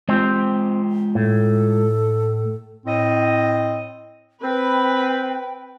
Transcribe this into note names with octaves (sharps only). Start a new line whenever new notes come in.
G#3 C4 F4 G4
A2 A4
A2 C4 D#5
C4 B4 G5